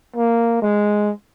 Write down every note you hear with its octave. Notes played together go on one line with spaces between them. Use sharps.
A#3
G#3